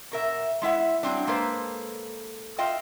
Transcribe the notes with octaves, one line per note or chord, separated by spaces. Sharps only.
B2 A#4 E5
G#3 E4 E5 F#5
F#3 G3 C4 D4
G#3 A#3 A4 B4 C5
F4 D#5 E5 G5